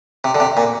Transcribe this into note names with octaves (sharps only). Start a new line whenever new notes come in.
C3
D3
C3
A#2